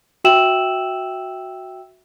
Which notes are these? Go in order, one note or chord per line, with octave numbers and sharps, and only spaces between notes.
F#4 E5 G5 E6 E7 F#7